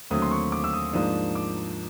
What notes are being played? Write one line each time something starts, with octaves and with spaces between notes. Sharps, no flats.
D#2 D3 F#3 A3 C4 D#6
C6
C#6
D6
E6
D#6
G#2 F3 A#3 D4 D#6
D6